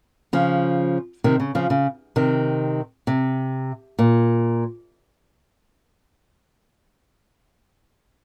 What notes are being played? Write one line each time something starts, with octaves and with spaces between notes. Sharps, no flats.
C#3 F3
C3 D#3
C#3
C#3 F3
C#3
C3 D#3
C3
A#2